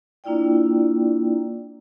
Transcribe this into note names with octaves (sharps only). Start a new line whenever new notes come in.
A#3 D4 E4 F4 D5 G5